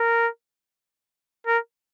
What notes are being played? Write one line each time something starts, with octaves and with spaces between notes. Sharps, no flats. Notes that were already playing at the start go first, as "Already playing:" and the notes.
Already playing: A#4
A#4